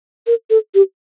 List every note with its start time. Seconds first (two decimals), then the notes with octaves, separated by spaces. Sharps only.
0.27 A#4
0.50 A4
0.75 G4